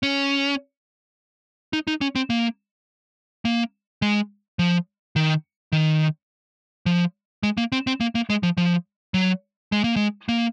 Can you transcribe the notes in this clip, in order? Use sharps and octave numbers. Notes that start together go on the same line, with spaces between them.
C#4
D#4
D#4
C#4
C4
A#3
A#3
G#3
F3
D#3
D#3
F3
G#3
A#3
C4
C4
A#3
A#3
G#3
F3
F3
F#3
G#3
A#3
G#3
A#3